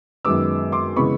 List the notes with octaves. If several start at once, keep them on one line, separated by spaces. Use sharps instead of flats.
F#2 D#3 G#3 B3 D6 E6
C6 D6
C#3 E3 G#3 B3 B5 C#6